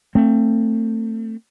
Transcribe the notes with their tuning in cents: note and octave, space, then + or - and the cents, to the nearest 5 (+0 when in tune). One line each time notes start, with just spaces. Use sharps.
A3 +30 C4 +20